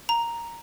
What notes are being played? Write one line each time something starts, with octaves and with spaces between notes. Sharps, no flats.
A#5